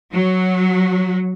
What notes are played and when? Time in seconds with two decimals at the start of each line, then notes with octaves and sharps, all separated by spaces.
0.13 F#3